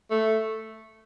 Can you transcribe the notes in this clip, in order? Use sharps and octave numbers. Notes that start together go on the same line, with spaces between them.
A3